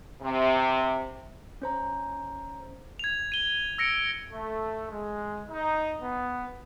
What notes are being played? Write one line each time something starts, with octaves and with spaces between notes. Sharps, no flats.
C3
C#4 C5 A#5
G#6 F7
D#7 G7
E6 A#6 C#7 D7
A3
G#3
D#4
B3